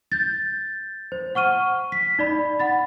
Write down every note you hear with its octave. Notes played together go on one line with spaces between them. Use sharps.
G6 A6
C5
F#5 C#6 F6 D#7
B6
D#4 D5 B5
F#5 B5 A6